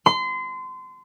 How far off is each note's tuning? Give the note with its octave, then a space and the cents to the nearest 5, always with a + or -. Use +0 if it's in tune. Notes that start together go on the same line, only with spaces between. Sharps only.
C6 -30